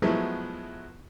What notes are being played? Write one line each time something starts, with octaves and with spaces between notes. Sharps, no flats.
F3 F#3 G#3 A3 B3 E4